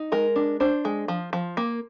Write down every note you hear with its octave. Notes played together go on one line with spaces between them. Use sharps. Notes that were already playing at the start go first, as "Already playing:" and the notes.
Already playing: D#4
G#3 A#4
D4
D4 C5
G#3
F3
F3
A#3